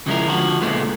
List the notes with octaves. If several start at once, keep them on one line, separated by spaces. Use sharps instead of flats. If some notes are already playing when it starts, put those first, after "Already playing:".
C#3 F3 G#3 C#4 E4 A#4
D3 F3 F#4
C#2 A#2 D3 G#3 A3 B3